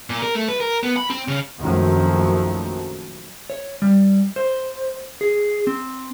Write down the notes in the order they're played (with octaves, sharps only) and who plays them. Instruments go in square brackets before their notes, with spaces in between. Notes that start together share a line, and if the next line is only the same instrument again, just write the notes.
[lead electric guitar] A#2
A#4
A3
B4
A#4
B3
B5
C4
C#3
[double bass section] A#1 F#2 D#3 F3 F#3 A3
[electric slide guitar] C#5
G3
C5
G#4
C4